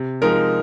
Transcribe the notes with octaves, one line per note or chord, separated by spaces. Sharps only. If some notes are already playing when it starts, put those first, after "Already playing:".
Already playing: C3
F3 G#3 D#4 A#4